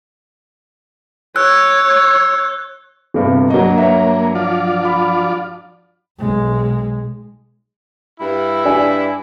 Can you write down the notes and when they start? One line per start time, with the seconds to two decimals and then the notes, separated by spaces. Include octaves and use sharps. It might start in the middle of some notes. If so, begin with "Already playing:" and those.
1.36 C#5 E6 F#6
3.14 G1 G2 C3
3.50 G2 F#3 A#3 D#5
3.78 C#5 E5
4.35 F3 F4 D5
4.85 B5
6.18 B1 G#3
8.20 G2 E4
8.65 D4 D5 G#5